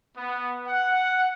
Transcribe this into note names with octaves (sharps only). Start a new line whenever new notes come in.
B3
F#5